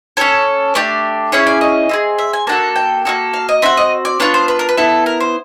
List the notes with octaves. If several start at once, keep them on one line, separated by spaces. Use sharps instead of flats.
C#4 F#4 A4 C#5
A3 D4 G4 D5
C#4 E4 G#4 C#5
D5
D#5
C4 E4 G#4
E5
G#5
A#3 D4 F#4 A4 A5
G5
A#3 D#4 F#4 A4
F5
D#5
C4 D#4 F#4 E5
D#5
D5
B3 D4 F4 C#5
C5
B4
A#4
B4
B3 E4 A4
A#4
C5